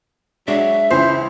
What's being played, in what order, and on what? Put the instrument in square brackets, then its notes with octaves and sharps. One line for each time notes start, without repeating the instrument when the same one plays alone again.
[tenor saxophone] F#3 [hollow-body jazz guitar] G#3 D4 [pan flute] E5
[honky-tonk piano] C#2 E3 C#4 [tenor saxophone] C5